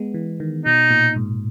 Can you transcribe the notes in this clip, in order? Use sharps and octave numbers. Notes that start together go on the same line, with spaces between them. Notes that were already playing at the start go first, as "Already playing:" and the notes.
Already playing: G#3 B3
E3
D#3
B2 D#4
A#2
G#2